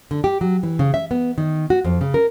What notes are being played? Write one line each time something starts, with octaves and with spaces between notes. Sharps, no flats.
D3
G4
F#3
E3
C#3
E5
B3
D#3
F#4
F2
C#3
A#4